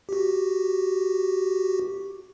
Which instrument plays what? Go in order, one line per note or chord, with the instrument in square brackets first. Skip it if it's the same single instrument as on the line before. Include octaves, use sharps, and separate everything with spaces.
[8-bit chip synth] F#4 G4